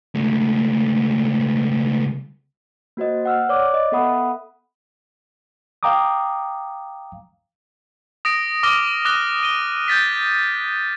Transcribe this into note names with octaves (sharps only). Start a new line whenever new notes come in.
C#2 A3
A#3 F#4 C5 D#5
F#5 E6 F6
C#5 D5 D6 F#6
D#5
B3 A4 E5 F#5 B5 D#6
F5 G5 A#5 D6 D#6
D#6 A#6 D7
D6 F6 A#6 G7
D6 D#6 F#6 A#6 G7
D#7 G7
G6 A6 B6